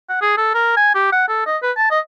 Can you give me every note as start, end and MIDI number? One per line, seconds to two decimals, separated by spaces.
0.10 0.17 78
0.22 0.35 68
0.38 0.54 69
0.54 0.76 70
0.77 0.91 80
0.95 1.10 67
1.12 1.24 78
1.28 1.45 69
1.47 1.57 75
1.63 1.72 71
1.77 1.89 81
1.91 2.00 75